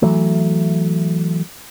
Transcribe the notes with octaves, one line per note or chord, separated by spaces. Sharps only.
E3 F#3 A3